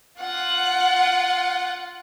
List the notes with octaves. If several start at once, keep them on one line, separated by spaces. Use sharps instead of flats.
F4 F#5